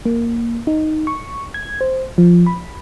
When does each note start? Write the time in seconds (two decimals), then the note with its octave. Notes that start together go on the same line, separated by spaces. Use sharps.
0.05 A#3
0.67 D#4
1.07 C#6
1.54 G#6
1.81 C5
2.18 F3
2.46 B5